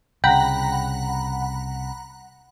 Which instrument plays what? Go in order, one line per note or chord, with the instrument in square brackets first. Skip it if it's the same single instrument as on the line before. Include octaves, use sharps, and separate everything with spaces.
[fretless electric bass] C2 C#3 [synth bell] F#5 A#5 B5 [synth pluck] G5